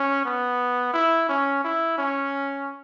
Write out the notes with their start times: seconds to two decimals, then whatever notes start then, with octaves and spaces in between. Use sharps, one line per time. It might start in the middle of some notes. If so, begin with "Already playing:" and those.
Already playing: C#4
0.25 B3
0.94 E4
1.29 C#4
1.64 E4
1.98 C#4